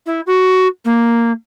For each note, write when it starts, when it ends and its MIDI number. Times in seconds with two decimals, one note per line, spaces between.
0.06 0.21 64
0.27 0.67 66
0.85 1.32 58